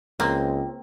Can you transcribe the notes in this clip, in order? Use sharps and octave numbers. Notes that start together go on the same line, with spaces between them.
C#2 A#3 C4